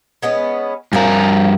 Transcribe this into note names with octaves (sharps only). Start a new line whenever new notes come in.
G#3 B3 C#4
G2 F3 A#4 G#5